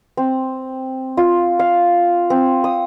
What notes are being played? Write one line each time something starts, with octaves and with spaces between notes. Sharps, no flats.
C4
F4
F5
C4
D#6